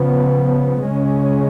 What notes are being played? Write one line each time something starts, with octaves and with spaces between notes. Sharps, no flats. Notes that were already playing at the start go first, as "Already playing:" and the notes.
Already playing: C#3 F3 B3
C#3 G#3 C#4